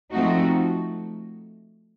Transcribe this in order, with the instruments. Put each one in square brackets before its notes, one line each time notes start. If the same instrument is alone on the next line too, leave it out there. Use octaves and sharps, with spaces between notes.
[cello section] F3 A3 C4 D#4 F#4